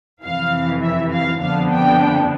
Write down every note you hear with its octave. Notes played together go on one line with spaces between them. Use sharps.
F2 C3 E3 F5
E5
F5
F2 D3 F3 B3 D4 F5
G5